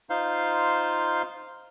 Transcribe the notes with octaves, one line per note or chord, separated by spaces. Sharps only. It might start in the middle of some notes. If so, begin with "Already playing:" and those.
D#4 F4 C5 F5 C6